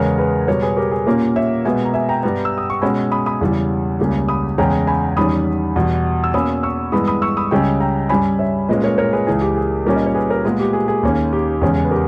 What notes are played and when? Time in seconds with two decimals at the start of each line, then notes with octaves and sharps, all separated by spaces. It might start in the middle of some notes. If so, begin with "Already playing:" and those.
Already playing: E2 C#3 G#3 B3 A#4 C#5
0.18 G#4 B4
0.47 B2 G3 B3 A#4 C#5
0.62 G#4 B4
0.77 G4 A#4
0.91 G#4
1.06 A#2 A#3 C#4 G4 A#4
1.36 C#5 E5
1.65 B2 G#3 B3 E5 G#5
1.85 A#5
1.94 E5 G#5
2.09 G5 A#5
2.23 G2 G3 B3
2.45 E6
2.58 D#6
2.70 C#6
2.82 B2 G#3 C#4 G#5 B5
3.12 B5 D#6
3.26 B5 D#6
3.41 E2 C#3 E3 G3
4.00 C#2 C#3 G3 A#3
4.29 B5 D#6
4.58 E2 C#3 G#3 C#4 G5 A#5
4.87 G#5 B5
5.16 E2 D#3 G3 C#4 B5 D#6
5.76 E2 B2 G3
6.24 E6
6.34 B2 A#3 C#4 B5 D#6
6.63 C#6 E6
6.92 G2 E3 G#3 B3 B5 D#6
7.08 B5 D#6
7.22 C#6 E6
7.37 B5 D#6
7.51 C#2 C#3 G3 C#4 D#5 G5
7.80 G5 A#5
8.09 G2 G3 C#4 G#5 B5
8.39 C#5 E5
8.68 A#2 G#3 C#4 B4 D#5
8.83 A#4 C#5
8.98 A#4 C#5
9.13 G#4 B4
9.27 C#2 C#3 E3 G#4
9.42 G4
9.56 G#4
9.86 A#2 G3 C#4 G4 A#4
9.96 D#5
10.06 C#5
10.15 G#4 B4
10.30 A#4 C#5
10.45 A#2 G#3 B3 G#4 B4
10.59 G4
10.73 G#4
10.88 G#4
11.03 D#2 D#3 A#3 C#4
11.33 G4
11.61 E2 C#3 G#3 C#4 G#4
11.84 B4
11.91 G4 A#4